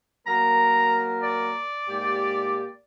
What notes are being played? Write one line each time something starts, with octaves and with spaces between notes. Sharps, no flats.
F#3 A#3 A#4 A#5
D5
G#2 A#3 G4